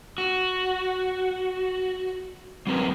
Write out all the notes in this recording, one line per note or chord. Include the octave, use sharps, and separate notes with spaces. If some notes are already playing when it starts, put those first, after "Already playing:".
F#4
F#3 C4 A#4 B4